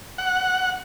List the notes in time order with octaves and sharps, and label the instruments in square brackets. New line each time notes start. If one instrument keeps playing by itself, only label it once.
[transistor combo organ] F#5